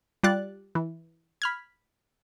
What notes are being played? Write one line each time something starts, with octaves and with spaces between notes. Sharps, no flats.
G3 F4 D5 F#6 A6
E3
B5 F6 G#6